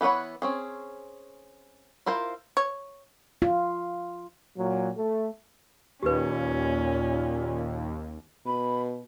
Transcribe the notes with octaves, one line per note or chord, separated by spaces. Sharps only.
E3 B3 B4 C#5 F#5
C4 C#4 G#4
E4 F4 A#4 C5
C#5
F4
A#2 F#3
A3
D#2 A#2 C#4 G4 B4
B2 B5